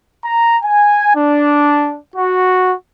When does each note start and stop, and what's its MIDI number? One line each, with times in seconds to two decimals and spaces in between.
0.25 0.58 82
0.63 1.15 80
1.16 2.00 62
2.16 2.75 66